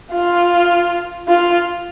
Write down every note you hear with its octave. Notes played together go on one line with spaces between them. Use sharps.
F4
F4